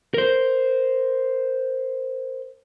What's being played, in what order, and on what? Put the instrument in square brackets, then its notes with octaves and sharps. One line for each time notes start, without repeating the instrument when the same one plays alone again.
[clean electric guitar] A#4 C5